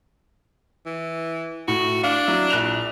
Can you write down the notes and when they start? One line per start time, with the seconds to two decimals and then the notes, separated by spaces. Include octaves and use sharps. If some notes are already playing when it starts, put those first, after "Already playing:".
0.86 E3
1.68 A2 F#4
2.03 D4 F5
2.27 F#3 E4
2.50 A#1 F#6 F7